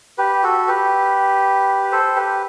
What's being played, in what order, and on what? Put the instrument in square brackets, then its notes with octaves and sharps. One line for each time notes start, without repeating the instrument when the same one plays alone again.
[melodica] G4 B4
F#4 A4
G4 B4
A4 C5
G4 B4